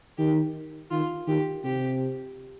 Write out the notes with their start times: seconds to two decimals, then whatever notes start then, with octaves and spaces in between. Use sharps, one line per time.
0.18 D#3 G4
0.91 D#3 F4
1.27 D#3 G4
1.64 C3 G4